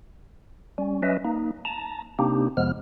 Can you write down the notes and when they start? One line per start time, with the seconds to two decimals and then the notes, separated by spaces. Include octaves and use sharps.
0.78 G3 C#4
1.02 F#3 C#4 B4 D#5 E5
1.25 A#3 D#4
1.65 A5 A#5
2.19 C3 A#3 C4 D4 D#4 G4
2.57 F2 C3 F3 G#3 B3 F6